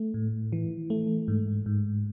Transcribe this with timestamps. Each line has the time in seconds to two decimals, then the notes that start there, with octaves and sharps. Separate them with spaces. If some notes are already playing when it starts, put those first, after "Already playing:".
Already playing: A3
0.14 A2
0.52 E3
0.90 A3
1.28 G#2
1.66 G#2